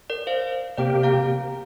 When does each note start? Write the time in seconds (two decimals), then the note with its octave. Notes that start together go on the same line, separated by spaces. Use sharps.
0.10 A#4 D5
0.27 C5 F5
0.77 C3 A#3 G4 D5 G5
1.03 F5 A#5